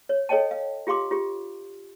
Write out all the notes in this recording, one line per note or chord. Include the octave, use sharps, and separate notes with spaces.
C#5
A4 C#5 D#5 G5 A5
F5
F4 G4 F5 C6 D6
F4 G4